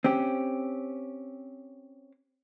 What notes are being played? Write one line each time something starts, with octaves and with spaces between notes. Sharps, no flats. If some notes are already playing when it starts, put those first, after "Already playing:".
C4 C#4 G4